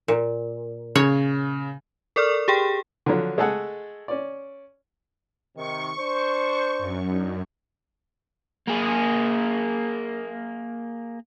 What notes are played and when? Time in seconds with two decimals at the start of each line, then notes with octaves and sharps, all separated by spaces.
0.08 A#2
0.95 C#3 C#5
2.16 A4 A#4 D5 C#6 F6
2.48 G4 G#4 G5
3.06 D3 F3 F#3
3.38 G#3 A3 G#4 A4 F#5
4.08 C#4 D5
5.56 C3 D#3 C#6
5.98 D4 C5
6.79 F#2
7.10 D4 D#4
8.68 A#3 G#4